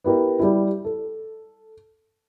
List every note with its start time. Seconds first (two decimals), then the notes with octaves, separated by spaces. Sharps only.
0.04 B3 E4 G4 A#4
0.39 G3 E4
0.85 A4